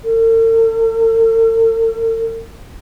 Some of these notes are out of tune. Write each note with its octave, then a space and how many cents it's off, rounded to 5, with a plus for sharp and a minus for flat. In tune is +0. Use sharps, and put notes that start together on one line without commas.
A4 +45